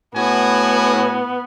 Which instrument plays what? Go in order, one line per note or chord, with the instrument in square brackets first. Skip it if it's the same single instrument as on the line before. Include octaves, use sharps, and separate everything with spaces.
[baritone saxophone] A2 [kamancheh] B3 [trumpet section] F#4 G#5